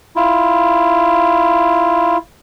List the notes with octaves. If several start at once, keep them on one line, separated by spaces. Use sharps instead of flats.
E4 F4